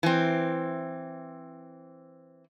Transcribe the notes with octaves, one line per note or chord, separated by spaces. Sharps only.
E3 C4